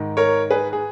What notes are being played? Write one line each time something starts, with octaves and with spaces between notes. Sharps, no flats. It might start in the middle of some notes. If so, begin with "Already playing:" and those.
Already playing: G#2 D#3
A#4 C#5
G#4 B4
G#4